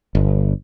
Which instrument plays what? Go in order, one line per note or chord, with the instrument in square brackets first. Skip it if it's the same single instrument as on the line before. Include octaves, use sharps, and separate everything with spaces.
[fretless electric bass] G1